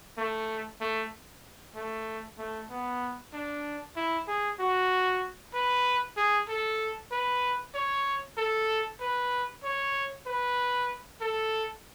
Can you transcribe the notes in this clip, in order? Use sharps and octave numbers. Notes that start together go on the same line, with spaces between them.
A3
A3
A3
A3
B3
D4
E4
G#4
F#4
B4
G#4
A4
B4
C#5
A4
B4
C#5
B4
A4